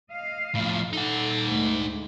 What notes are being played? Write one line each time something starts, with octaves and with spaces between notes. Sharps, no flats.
D#5 F5
A2 F3
D#4 A4 F#5
D2 G#2 G#3